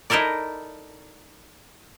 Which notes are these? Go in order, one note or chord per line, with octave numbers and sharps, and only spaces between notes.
D#4 E4 A4 A#4 D5